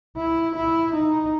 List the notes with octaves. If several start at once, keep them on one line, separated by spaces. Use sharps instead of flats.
E4
E4
D#4